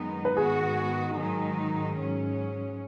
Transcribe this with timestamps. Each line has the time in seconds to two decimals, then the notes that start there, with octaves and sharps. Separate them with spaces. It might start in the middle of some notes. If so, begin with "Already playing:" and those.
Already playing: F#2 D#3 G#3 B3 D#4
0.25 B4
0.36 G#2 D#3 B3 F#4 G#4
1.18 G#2 D#3 F#3 D#4
1.98 G#2 F#3 C#4